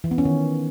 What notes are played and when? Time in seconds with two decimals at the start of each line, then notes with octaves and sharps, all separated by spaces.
0.04 E3
0.11 B3
0.18 C#4
0.25 D#3